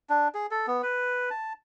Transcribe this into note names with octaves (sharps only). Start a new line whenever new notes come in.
D4
G#4
A4
B3
B4
A5